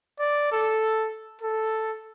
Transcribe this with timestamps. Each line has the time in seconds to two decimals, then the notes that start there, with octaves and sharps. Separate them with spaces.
0.20 D5
0.52 A4
1.42 A4